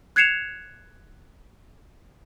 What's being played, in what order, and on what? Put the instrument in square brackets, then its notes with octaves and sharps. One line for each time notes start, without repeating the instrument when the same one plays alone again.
[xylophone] F#6 G#6 C7 C#7 E7 F7